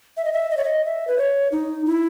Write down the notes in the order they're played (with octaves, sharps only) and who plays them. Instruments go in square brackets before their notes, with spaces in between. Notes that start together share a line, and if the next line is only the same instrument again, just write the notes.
[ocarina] E5
D#5
E5
D#5
C#5
D#5
E5
B4
C#5
D#4
E4